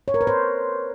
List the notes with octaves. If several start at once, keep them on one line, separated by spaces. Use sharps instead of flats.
C#5
A#4
B4
C5